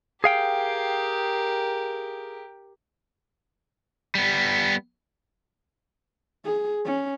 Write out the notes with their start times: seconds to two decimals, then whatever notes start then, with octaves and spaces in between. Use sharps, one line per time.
0.24 G4 G#4 A#4 F5 G5
4.15 G3 B3
6.45 G#4
6.85 C#4